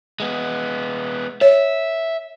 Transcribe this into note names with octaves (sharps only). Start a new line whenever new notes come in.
G#3 B3
C#5 E5